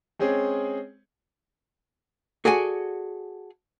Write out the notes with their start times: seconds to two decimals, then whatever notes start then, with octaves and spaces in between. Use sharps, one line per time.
0.19 G#3 C4 C#4 G#4
2.45 F#4 G#4 A4 D5 F#5 G#5